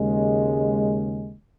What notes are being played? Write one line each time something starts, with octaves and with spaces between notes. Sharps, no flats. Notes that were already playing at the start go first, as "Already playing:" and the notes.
Already playing: D#2 C#3 G#3